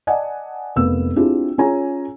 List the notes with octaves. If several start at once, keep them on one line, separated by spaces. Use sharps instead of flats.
D5 D#5 F#5 G#5 A5
F1 A#3 B3 E6
C4 D4 E4 F4 G4 G#4
C#4 F4 G#4 C#5 G#5 A#5